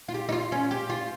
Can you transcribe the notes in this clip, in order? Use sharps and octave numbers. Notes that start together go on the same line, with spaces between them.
F4
G4
D#4
F4
C#4
G4
F4